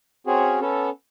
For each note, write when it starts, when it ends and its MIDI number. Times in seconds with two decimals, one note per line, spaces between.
0.27 0.60 60
0.27 0.60 61
0.27 0.60 66
0.27 0.60 68
0.61 0.90 59
0.61 0.90 61
0.61 0.90 69